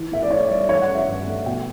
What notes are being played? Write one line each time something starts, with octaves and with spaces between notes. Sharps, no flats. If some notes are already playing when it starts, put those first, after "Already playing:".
Already playing: E3
A2 E5
D5
A2 C#5
G3 D5
E3 C#5
F#5
C#4
E5
G2
A3
B2 G5